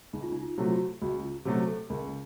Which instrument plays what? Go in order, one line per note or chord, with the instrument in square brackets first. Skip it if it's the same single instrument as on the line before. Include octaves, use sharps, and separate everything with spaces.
[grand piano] C#2 [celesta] D#4
[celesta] F4
D#4
F4
[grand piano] C3 F#3 A3
[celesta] F4
F#4
[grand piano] C#2 [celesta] F#4
[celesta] F4
[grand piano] C3 F#3 A3 [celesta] F#4
[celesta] A4
[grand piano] C#2 [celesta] A#4